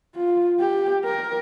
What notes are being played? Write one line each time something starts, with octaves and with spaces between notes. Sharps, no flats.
F4
G4
A#4